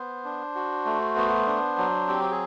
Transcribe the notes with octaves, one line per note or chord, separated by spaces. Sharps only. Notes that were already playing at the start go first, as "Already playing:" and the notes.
Already playing: B3 C5
D4
F#4
A3
B3
D4
F#3
C4 G4
G#4